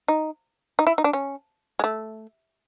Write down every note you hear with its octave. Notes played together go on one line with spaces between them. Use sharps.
D#4
D#4
E4
D#4
D4
C#4
G#3
A3